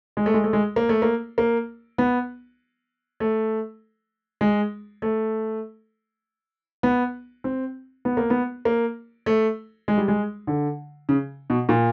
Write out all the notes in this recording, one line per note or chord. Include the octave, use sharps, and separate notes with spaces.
G#3
A3
G#3
A3
G#3
A#3
A3
A#3
A#3
B3
A3
G#3
A3
B3
C4
B3
A#3
B3
A#3
A3
G#3
G3
G#3
D3
C#3
B2
A#2